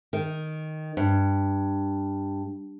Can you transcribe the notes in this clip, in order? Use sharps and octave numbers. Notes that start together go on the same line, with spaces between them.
D#3
G2